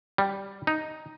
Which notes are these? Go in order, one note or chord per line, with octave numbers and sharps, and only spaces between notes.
G3
D#4